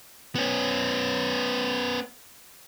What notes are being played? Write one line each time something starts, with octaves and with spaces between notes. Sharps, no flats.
B3 C#4